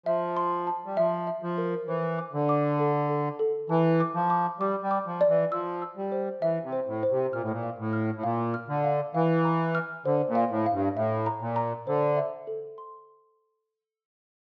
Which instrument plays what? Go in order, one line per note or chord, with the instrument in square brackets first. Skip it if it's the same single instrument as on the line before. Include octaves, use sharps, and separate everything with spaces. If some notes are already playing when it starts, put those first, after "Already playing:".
[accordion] F3 [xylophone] E5
[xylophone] C6
A5
[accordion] G3
[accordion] F3 [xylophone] E5
[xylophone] E5
[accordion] F3
[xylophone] A#4
[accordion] E3 [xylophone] C5
[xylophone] D6
[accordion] D3
[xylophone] D6
A4
A4
A4
[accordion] E3 [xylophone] A5
[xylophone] D6
[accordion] F3
[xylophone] D6
[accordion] G3 [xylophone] D6
[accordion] G3
[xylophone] D6
[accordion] F3
[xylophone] D5
[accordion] E3
[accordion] F3 [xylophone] E6
[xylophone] E6
[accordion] G3
[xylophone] C5
[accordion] E3 [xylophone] E5
[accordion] C3
[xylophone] C5
[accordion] A2
[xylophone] C5
[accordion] C3
[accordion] A#2 [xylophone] F6
[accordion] A2
A#2
[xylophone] F5
[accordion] A2
[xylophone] F6
[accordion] A2
[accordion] A#2 [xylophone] F5
[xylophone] F6
[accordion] D3
[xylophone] F5
[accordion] E3 [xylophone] F5
[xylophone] A#5
F6
[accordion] D3 [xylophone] C5
[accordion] A#2
[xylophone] F5
[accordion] A2
[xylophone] F5
[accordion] G2
[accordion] A2 [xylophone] E5
[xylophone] A#5
[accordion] A#2
[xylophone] A#5
[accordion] D3 [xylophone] C5
[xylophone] E5
A4
C6